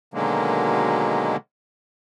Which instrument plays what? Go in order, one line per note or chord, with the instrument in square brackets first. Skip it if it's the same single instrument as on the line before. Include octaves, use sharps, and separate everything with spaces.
[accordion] B2 D3 D#3 F#3 G#3 A#3